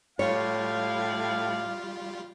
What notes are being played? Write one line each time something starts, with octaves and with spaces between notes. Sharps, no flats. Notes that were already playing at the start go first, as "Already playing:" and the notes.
A2 G3 E4 F4 G4 C#5 F5